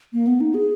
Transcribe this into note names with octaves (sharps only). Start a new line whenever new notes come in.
A#3
B3
D#4
G#4